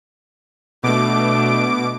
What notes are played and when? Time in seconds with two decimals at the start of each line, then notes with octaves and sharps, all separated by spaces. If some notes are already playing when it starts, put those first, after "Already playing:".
0.83 B2 A3 D4 D6 D7